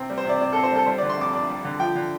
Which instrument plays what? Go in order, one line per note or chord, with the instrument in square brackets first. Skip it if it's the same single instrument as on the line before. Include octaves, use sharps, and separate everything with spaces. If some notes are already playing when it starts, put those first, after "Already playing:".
Already playing: [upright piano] C3 C4
G3
C5
C3 D5
C3 D5
A4
C4
C5
G3 A4
G3 C5
D5
D3
C6
F2 D6
D4 D6
G3
D3
F3 G5
D3